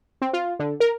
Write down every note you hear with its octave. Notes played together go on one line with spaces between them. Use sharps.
C4
F4
D3
A#4